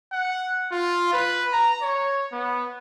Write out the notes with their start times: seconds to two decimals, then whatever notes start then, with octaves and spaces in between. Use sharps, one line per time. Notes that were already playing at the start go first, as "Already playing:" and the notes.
0.12 F#5
0.72 F4
1.13 B4
1.53 A#5
1.82 C#5
2.32 B3